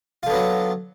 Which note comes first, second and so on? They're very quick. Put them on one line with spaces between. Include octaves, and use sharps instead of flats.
F4 D3 B3 F#3